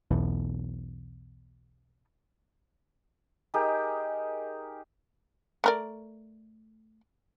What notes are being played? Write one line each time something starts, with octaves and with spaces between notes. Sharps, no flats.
B1 E2 B2
D#4 G4 G#4 A#4
A3 A#4 D5